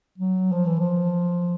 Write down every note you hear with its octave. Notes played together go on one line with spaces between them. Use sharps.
F#3
F3
E3
F3